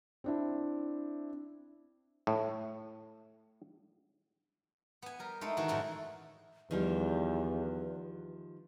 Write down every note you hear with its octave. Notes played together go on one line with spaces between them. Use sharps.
C4 D4 E4
A2
B3 G#5
G3 A#4
G#3 A3 D#4 E4
D#3 E3 D#4 E4 F#4
F#2 A2 G#3 F#4
E2 D#3 F3 G3 B4